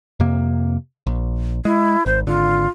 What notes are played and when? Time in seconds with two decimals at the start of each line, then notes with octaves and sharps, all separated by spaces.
0.20 F2 C3 A#3
1.07 A#1
1.65 G#3 E4
2.06 G#1 C5
2.27 G#1 D3 F4